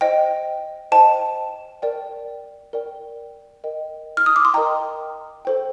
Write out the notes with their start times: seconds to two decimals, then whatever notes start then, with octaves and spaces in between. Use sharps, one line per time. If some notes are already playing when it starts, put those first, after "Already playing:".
0.01 C5 D#5 G5
0.92 C5 D#5 G5 A5
1.82 A#4 D5 G5
2.73 A#4 D5 G5
3.64 A#4 D#5 G5
4.17 F6
4.26 D#6
4.36 D6
4.45 C6
4.54 A#4 D#5 G5 A#5
5.45 A4 C5 G5